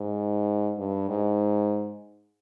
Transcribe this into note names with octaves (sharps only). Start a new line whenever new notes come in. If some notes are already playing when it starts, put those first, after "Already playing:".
Already playing: G#2
G2
G#2